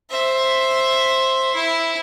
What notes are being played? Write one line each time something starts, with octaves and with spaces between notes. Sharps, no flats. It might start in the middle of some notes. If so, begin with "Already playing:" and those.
C5 E5
E4